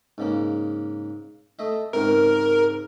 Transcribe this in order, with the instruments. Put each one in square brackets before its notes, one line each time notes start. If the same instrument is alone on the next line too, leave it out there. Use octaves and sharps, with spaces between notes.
[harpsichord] G#2 C#3 A#3
A3 D#5 E5
[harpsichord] C#2 G#2 C3 [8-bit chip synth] A#4